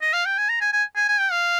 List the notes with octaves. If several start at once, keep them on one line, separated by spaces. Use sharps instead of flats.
D#5
F5
G5
G#5
A#5
G#5
G#5
G#5
G#5
G5
F5